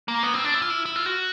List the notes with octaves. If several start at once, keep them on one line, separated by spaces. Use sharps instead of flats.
A#3
B3
C4
D4
E4
F4
E4
E4
F4
F#4